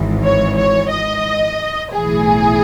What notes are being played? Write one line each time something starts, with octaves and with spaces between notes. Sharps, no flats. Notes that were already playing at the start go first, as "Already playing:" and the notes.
Already playing: G#1 G#2 E3
C#5
C#5
D#5
B1 A2 E3 G#4